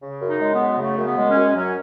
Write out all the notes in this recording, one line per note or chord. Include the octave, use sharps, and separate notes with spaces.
C#3
F#2
D#4
G#3
B3
F#2
C#3 A3
F#2
B3
G#3
C#4
F#2
F#3 C#4